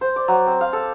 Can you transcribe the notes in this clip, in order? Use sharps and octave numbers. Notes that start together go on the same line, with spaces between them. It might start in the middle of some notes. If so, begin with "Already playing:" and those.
C5
D5
F#3
C4
F5
A4